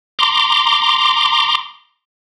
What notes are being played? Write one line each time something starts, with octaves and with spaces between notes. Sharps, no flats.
A#5 C6 D6